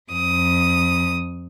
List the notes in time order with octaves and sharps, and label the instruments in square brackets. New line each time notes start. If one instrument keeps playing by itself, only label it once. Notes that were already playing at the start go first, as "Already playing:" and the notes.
[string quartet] F2 D#6